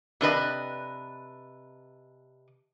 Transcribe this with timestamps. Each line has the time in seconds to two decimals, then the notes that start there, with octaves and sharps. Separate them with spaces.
0.21 C3 D4 B4 D#5